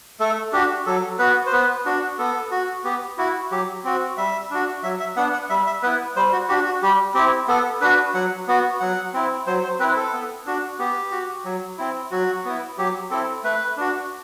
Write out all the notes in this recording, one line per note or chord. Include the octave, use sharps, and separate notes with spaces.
A3 A4
D4 F#4 G4
F#3 A4
B3 F#4 B4
C5
B3 B4
D4 F#4
B3 A4
F#4
B3 G4
E4 F#4
F#3 G4
C4 F#4
G3 E5
D4 F#4
F#3 E5
E5
B3 D4 F#5
F#5
G3 E5
E5
B3 E4 B4
G3 C5
F#4
D4 F#4 G4
F#4
G3 G4
C4 E4 G4
B3 A4
D4 F#4 B4
F#3 F#5
B3 F#4
F#3 F#5
C4 E4
F#3 C5
C5
C4 E4 B4
A4
B3
D4 F#4
B3 G4
F#4
F#3
C4 E4
F#3 F#4
B3 E4
F#3 G4
C4 E4 A4
A3 B4
D4 F#4